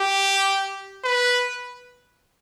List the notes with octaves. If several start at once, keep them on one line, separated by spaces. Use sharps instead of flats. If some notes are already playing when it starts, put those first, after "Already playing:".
Already playing: G4
B4